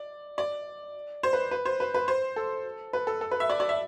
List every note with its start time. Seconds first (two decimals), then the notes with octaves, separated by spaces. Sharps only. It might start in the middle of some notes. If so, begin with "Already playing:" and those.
Already playing: D5
0.38 D5
1.23 C5
1.33 B4
1.51 B4
1.65 C5
1.80 B4
1.94 B4
2.08 C5
2.36 A4
2.93 B4
3.07 A4
3.21 A4
3.31 B4
3.40 E5
3.50 D5
3.60 D5
3.69 E5